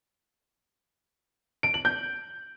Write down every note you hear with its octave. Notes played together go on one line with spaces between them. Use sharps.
D7
F#7
G6